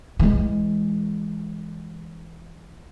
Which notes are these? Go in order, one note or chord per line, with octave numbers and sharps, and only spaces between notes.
E3 G#3